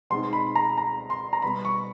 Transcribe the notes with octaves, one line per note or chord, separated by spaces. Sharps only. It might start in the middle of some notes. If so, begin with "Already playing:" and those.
B2 G#3 C4 D#4 C6
B5
A#5
A#5
C6
A#5
B2 G3 B3 B5
C#6